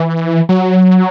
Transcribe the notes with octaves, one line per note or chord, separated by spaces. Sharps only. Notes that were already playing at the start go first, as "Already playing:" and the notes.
Already playing: E3
F#3